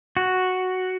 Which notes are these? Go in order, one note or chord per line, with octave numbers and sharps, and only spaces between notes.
F#4